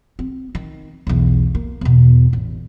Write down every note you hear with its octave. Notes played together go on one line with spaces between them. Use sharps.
C4
D#3
B1 E2
A#3
E2 B2
A1